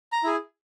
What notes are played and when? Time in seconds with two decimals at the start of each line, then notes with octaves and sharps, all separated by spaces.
0.12 A#5
0.24 E4 G#4